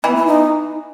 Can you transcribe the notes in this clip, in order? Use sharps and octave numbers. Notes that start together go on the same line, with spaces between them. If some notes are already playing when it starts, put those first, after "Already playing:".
E3 B3
E4
D#4